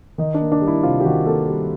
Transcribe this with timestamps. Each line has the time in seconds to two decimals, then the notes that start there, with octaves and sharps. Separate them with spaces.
0.18 D#3 D#4
0.34 D4
0.41 A#3
0.52 D4
0.61 G3
0.68 E4
0.83 C3 F4
1.01 G4
1.05 D#3 F#4
1.26 A#3 A4
1.49 G3